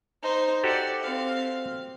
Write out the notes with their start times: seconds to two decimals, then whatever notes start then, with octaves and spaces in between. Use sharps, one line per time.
0.23 D#4 C5
0.64 F#4 G4 A4 C5 D5
1.03 C4 F5